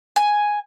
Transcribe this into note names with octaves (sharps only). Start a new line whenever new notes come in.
G#5